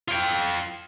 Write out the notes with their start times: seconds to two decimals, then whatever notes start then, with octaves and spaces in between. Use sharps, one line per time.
0.08 F4 G5